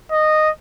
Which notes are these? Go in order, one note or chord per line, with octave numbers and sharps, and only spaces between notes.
D#5